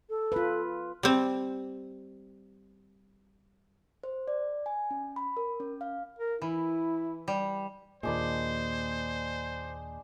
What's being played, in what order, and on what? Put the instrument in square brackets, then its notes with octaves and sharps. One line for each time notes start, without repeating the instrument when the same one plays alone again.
[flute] A4
[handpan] F4 B4
[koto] G3 C4
[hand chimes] C5
D5
G#5
C#4
B5
A#4
C#4
F5
[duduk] A#4
[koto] E3 [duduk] E4
[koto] G3
[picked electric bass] D#2 A#2 [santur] G#3 D4 B4 [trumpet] C5